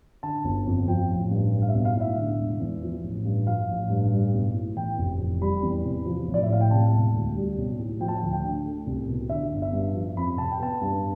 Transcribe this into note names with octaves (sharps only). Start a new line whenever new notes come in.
D3 A5
G1
F2
F3 G5
A1
G2
G3
F5
E5
B1
F5
A2 E5
D3
E1
E2
F3
A1
G2
F3 F5
A1
G2
G3
B1
A2
E3 G5
F1
F2
G3 B5
E2
C3
F3
A1
D5
E5
A2 F5
G5
C3 A5
E1
D2
G3
B1
A2
F3 G5
A5
G5
D2
G5
D3
A3
C2
B2
D3 E5
G1
E5
G2
F3
F2 B5
C3 A5
G5
B3 A5
G2